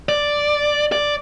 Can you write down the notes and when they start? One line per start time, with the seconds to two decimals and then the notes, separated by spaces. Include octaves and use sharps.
0.09 D5
0.92 D5